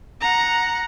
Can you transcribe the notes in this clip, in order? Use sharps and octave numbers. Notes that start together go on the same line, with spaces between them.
F#5 A#5